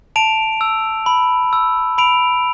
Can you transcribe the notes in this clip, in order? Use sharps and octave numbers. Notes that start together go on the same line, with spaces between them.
A5 D7 F7
E6
B5
E6
B5 D7 F7